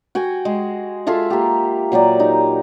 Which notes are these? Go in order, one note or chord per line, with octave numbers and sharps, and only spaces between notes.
F#4 G5 G#5
G#3
F4 G#4 A4 E5
A#3 G4
A#2 F#3 G4 D5
D#4